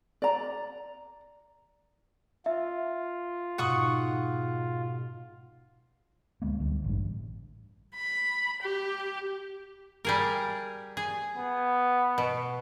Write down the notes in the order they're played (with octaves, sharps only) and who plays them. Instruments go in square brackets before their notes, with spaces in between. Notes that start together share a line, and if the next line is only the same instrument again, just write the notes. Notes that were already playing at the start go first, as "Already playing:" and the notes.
[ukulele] D5 A#5
[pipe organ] F4 [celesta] E5
[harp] G#2 B2 [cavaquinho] F#5 C#6 D#6
[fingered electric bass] D2 G#3 A#3 B3
D2 G3
A1 G2
[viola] B5
G4
[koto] G3 G#4 A#4
G#4
[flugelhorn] B3
[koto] B2